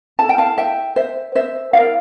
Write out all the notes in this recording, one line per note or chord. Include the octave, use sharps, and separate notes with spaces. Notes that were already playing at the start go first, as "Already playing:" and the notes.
E4 A4 A5
G5
F5 A5
E5 G5
C5 E5
C5 E5
E4 G4 A#4 D5 F5